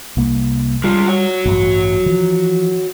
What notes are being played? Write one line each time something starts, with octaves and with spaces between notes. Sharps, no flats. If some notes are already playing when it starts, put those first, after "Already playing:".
C2 A#3
G3 G#3 F4
F#4 C#5
A1 G2 F#3
E3 F3